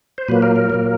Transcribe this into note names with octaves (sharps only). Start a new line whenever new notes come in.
C5
A#2 F#3 A#3 B4
A#4
A#4
A#2 F#3 A#3